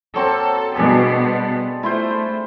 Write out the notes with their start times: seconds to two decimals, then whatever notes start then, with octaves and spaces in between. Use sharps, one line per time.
0.16 F#3 A#3 C4 A4
0.75 B2 G3 B3 D4 G#4 A4
1.83 A3 E4 F4 C5